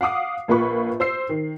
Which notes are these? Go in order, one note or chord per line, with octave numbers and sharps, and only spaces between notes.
F5 F#5 D6 D#6 C7
A#1 A#3 F4 B4 B5 C#6
C5 E6 C7
D#3